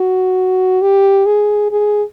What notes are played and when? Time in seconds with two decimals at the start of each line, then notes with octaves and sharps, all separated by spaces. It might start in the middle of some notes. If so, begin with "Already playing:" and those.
Already playing: F#4
0.82 G4
1.26 G#4
1.71 G#4